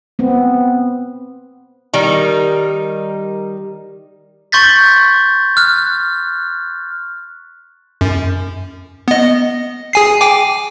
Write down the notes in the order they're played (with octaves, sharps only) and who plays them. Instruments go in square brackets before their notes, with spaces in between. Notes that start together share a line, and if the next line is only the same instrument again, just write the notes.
[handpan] B3 C4
[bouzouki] D#3 G3 D#4 A#4
[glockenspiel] C6 C#6 G6 A6 B6
F6 F#6
[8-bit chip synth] F#2
B3 D#5
G#4 G#5 C7
G5 G#5 D6